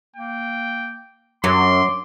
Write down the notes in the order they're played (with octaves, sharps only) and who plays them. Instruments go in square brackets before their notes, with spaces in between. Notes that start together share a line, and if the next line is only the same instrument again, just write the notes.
[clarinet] A#3 [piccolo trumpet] G5
[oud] F#2 [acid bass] F#3 [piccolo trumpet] C6 [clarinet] D6